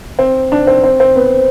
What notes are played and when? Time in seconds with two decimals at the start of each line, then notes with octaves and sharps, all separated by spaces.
0.19 C4
0.52 D4
0.67 C4
0.83 C4
1.00 C4
1.16 B3